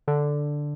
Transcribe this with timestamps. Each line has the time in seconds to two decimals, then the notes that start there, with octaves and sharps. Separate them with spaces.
0.08 D3